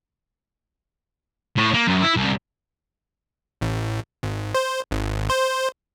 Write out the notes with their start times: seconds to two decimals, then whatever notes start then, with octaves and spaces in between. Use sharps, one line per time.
1.57 A2
1.74 A#3
1.88 F#2
2.03 E4
2.17 C2
3.61 A1
4.23 G#1
4.55 C5
4.91 G#1
5.30 C5